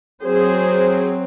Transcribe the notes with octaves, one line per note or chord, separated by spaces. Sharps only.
F#3 C4 G#4 C5